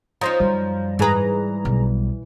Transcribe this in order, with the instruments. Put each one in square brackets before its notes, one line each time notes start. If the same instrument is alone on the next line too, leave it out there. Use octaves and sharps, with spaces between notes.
[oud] F3 C#4 D#4 [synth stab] C5 A#5 [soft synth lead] D#6
[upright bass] F#2 [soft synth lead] G3
[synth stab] G#2 G#4 A#5 [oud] E3 B4
[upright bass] B1